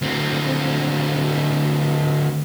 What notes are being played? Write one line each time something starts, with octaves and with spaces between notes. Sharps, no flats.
D2 C4